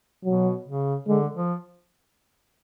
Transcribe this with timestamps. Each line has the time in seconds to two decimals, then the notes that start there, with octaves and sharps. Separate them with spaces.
0.24 B2 F#3
0.66 C#3
1.07 D3 G#3
1.35 F3